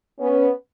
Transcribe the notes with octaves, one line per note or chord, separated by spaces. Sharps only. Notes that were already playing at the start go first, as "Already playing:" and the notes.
B3 C#4